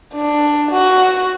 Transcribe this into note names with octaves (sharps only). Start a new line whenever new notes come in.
D4
F#4